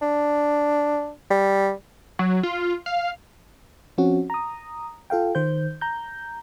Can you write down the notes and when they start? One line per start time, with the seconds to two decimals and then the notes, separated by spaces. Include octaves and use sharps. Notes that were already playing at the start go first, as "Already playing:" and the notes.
0.02 D4
1.31 G3
2.19 F#3
2.43 F4
2.86 F5
3.98 F3 C4 C#4 F#4
4.30 A#5 D#6
5.10 F4 A4 F5 G5
5.35 D#3 C5 G6
5.81 A#5 G6